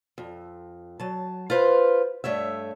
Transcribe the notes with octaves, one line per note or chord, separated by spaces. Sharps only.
F2
F#3 A5
F4 B4 C5
G2 A3 C#5 E5